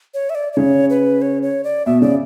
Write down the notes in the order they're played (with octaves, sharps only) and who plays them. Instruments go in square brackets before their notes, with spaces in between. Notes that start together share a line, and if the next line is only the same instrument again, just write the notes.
[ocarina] C#5
E5
D5
D5
[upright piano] C#3 [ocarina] C#5
[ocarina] B4
C#5
C#5
D5
[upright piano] B2 [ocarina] E5
[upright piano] C#3 [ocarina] D5